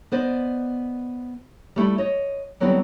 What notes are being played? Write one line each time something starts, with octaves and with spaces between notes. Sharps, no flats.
B3 C5 D5 D#5
G3 A3 E4
C#5 D#5
D3 F#3 G3 B3 C4 E4